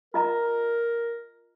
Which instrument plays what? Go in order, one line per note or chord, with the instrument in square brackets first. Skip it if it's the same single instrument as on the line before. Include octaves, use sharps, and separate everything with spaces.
[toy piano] F4 D#5 A#5 [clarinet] A#4